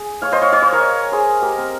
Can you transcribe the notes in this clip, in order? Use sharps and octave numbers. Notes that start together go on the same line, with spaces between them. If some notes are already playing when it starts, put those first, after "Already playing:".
Already playing: G#4
C#5 F5
C5 D#5
C#5 F5
C#5 F5
C5 D#5
A#4 C#5
G#4 C5
G4 A#4
C4